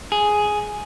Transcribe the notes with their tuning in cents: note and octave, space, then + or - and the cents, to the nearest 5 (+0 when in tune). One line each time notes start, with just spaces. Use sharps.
G#4 +5